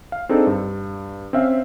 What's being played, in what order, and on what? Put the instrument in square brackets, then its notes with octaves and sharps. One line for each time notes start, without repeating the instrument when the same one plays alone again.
[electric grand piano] F5
C4 D4 D#4 G#4 A4
G2
C4 C#4 E5 F5